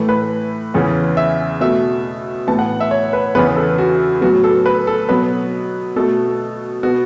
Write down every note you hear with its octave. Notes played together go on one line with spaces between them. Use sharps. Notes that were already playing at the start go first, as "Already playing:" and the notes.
Already playing: A2 E3 A3
B4
E2 C#3 E3
E5
B2 A3 E5
A2 E3 B3 A5
F#5
E5
C#5
B4
E2 C#3 E3 B3 B4
A4
F#4
A2 F#3 B3 F#4
A4
B4
A4
B2 F#3 B3 B4
B2 A3 A4
B2 B3 F#4